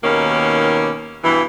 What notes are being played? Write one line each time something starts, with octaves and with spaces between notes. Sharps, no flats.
D#2 B2 D#3 A#3 C#4
G2 B2 E3